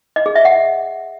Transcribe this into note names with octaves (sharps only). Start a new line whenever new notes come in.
D#5
G#4
E5
F#5